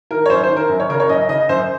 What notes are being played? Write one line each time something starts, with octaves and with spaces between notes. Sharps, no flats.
D#3 A#4
C#5
F#2 C5
C5
D#3
A#4
F#2
C#5
C#3 A#4
C#5
F#2 D#5
C#3 D#5
F#2 C5